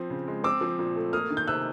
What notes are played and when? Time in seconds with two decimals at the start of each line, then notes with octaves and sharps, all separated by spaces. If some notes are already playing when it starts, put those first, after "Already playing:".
Already playing: F3 C4
0.10 C#3
0.28 G#3
0.44 C4 D6 E6
0.61 F3
0.79 A#2
0.96 A3
1.13 A#3 D#6 F6
1.30 D#3
1.37 G6
1.47 C3 E6 F#6